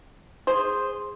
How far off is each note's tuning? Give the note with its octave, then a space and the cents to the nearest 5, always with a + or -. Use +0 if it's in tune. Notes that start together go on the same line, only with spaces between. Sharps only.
G#4 -10 C5 +0